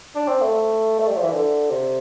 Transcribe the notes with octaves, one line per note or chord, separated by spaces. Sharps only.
D4
C4
A3
A3
G3
F3
E3
D3
C3